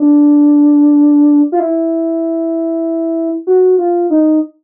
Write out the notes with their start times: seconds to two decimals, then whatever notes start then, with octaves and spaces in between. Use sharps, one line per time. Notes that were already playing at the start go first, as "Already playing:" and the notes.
Already playing: D4
1.52 F4
1.60 E4
3.47 F#4
3.78 F4
4.10 D#4